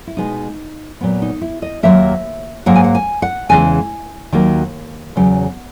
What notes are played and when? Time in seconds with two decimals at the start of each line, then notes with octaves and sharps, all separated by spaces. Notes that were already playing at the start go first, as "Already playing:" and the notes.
0.07 E4
0.17 B2 G#3 B3 D#4
1.01 A#2 F#3 B3
1.22 D#4
1.41 E4
1.62 D#5
1.83 D#2 D#3 F#3 A#3 E5
2.66 G#2 F#3 A#3 F#5
2.75 G#5
2.84 F#5
2.95 G#5
3.22 F#5
3.49 E2 C#3 E3 G#3 B3 G#5
4.32 D#2 D#3 F#3 A#3
5.16 E2 C#3 F#3 F#5